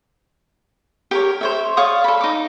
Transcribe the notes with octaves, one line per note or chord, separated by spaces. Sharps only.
G4 A#4 C#5
C5 C#5 E5
C#5 D5 F5 D#6
A4 B5
D#4 D6